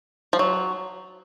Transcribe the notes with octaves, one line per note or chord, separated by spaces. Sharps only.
F3
F#3